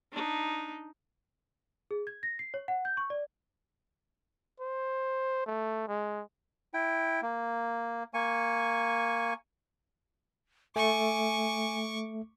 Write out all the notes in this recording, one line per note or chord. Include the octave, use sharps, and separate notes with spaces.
D4 D#4
G#4
G#6
A#6
C7
C#5
F#5
G6
C#6
D5
C5
A3
G#3
E4 G5
A#3
A#3 G#5 C#6
A3 G#5 C#6 D6